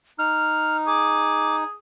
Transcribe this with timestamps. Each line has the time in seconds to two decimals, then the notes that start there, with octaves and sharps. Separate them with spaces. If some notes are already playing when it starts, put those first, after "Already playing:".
0.19 D#4 F6
0.87 G#4 D6